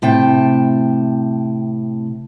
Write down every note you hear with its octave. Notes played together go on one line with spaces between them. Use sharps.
A2 C3 G5 A5